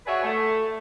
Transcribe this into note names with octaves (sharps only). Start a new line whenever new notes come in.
F#4 G#4 B4 C#5 D5 E5
A3